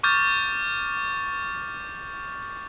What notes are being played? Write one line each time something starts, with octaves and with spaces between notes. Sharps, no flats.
C#6 D6 F6 G6 A6